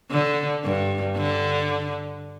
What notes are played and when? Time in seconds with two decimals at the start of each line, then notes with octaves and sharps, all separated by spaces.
0.11 D3
0.64 G2
1.17 D3